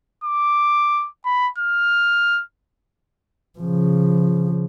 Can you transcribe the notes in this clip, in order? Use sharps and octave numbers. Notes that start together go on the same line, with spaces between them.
D6
B5
F6
C#3 F3